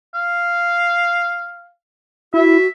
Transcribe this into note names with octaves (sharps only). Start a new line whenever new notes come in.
F5
E4 F#4 E5